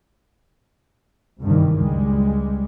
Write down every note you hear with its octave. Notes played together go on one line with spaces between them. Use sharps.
F#1 C2 G2 D#3 E3 G3
C#2 G3 G#3